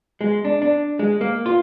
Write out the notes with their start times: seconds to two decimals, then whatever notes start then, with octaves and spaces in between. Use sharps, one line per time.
0.21 G#3
0.45 D4
0.62 D4
0.99 G#3
1.21 A#3
1.46 F4